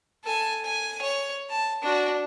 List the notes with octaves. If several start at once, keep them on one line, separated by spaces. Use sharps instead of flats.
A4 G#5
G#5
C#5
A5
D4 F#4